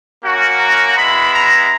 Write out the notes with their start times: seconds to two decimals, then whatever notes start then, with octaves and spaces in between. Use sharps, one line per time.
0.24 A#3 C#4 F#4
0.60 A#5
0.97 G#3 B3 E4 B5
1.33 A#5